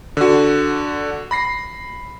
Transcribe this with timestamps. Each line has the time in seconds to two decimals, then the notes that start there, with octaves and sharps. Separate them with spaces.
0.17 D3 F#4
1.31 B5 A#6 C7